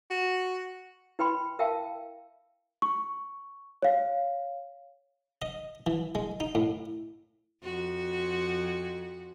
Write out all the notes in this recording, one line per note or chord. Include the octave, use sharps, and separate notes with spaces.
F#4
E4 B4 G5 B5 C6
A#4 E5 F5 G5 A5
C#6
C#5 F5
D#5
E3
G#3
D#4
A2
F2 F#4